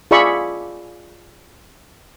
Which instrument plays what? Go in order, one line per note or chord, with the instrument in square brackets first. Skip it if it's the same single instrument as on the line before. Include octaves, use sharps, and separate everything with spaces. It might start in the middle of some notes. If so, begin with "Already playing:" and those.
[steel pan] F4 G#4 D5 E5 B5 C#6